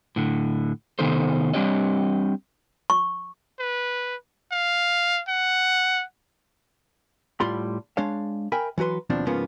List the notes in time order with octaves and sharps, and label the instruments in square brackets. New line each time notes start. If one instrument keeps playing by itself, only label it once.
[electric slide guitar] A2 D3
C3 D#3 B3 D#4 A4 C5
G3 C4 D4 G4 C#5 D#5
[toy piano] C#6
[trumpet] B4
F5
F#5
[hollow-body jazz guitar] A2 G3 F4 B5 C6
G#3 D4 C#5 F5
A#4 E5 G5 G#5 B5
E3 F#3 F#4 B4 C6
D#2 B2 F3 A#3 C4 D4
G#2 C#3 F3 G#3 A#3 B3